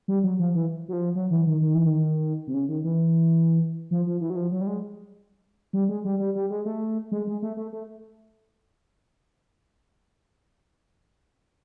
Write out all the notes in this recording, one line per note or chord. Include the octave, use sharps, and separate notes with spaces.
G3
F#3
F3
E3
F#3
F3
F#3
E3
D#3
D#3
E3
D#3
C3
C#3
D#3
E3
F3
F3
E3
F#3
F3
F#3
G3
G#3
G3
G#3
G3
G3
G3
G#3
A3
G#3
G#3
A3
A3
A3